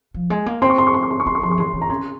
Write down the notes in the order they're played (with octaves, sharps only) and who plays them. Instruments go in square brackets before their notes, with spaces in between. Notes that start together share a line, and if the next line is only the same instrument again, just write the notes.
[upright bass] F3
G#3
A#3
[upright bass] C4 [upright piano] C6
[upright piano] C#6
C6
C#6
C6
C#6
C6
C#6
[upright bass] C4 [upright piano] C6
[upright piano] C#6
[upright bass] F3 [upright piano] C6
[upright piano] C#6
[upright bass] E3 [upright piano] C6
[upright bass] E3
[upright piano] A#5
[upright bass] C#3 [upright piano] C6